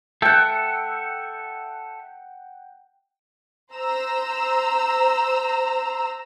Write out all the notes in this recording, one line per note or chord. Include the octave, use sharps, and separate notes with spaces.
A4 E5 F#5 G5
C5 A#5 E6